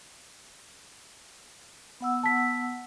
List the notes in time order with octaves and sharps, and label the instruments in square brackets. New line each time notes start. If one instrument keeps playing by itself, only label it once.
[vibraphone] B3 F#5 E6
[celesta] A5 B6